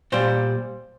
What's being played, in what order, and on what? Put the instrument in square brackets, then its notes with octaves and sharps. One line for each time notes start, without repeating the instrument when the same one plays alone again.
[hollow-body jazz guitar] A#2 G3 C5